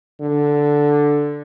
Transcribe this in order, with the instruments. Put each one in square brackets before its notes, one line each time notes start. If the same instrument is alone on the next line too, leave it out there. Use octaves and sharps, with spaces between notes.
[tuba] D3